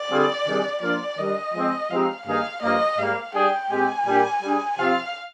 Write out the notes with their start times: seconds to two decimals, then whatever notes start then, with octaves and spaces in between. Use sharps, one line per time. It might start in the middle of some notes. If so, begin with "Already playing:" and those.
Already playing: D5
0.10 D3 G3 C4 F4 G#4
0.46 C3 D#3 G3 D4 G#4
0.82 F3 A#3 D4 F4 D5
1.18 D#3 G3 D4 D#5
1.54 F3 G#3 C4
1.90 F3 G#3 C4 D#4 G4 F5
2.26 G2 D#3 A#3 D#4 G#4 F5
2.62 G2 F3 A#3 D#5
2.99 G#2 G3 A#3 F5
3.34 G3 D4 G#4 G5
3.70 A#2 G#3 C4 G4 G#5
4.07 A#2 G3 D4 G4 A#4
4.42 G3 D4 G#4
4.78 C3 F3 C4 F4 F5